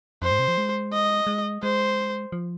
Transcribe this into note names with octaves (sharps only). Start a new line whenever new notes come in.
F2 C5
G#2
C3
F3
G#3
D#5
G#3
G#3 C5
F3